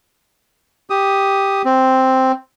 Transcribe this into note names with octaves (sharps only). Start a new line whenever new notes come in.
G4 D#6
C4